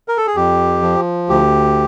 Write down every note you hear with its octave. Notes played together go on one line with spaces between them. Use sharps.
A#4
A4
G#4
F2 G4
F3
D2 G4